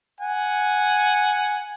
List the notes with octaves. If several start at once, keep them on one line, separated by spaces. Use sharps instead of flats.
F#5 G#5